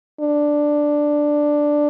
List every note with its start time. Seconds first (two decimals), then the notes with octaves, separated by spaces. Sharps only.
0.21 D4